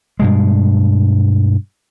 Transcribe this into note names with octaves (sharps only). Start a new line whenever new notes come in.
G2 B2 G#3